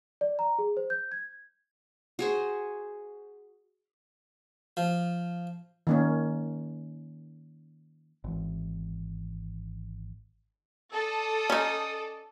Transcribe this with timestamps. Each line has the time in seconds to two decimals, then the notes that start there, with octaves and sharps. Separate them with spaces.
0.21 D5
0.39 A#5
0.59 G#4
0.77 C5
0.90 G6
1.12 G#6
2.19 F#4 G#4 C5
4.77 F3
5.87 D#3 A#3 C#4
8.24 G#1 E3
10.92 A4 D5 D#6
11.50 C#4 D#4